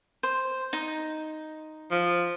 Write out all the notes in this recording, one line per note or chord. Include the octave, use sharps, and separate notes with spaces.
C5
D#4
F3